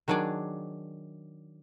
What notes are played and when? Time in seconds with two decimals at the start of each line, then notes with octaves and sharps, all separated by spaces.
0.08 D#3 F#3 D4 G#4 D5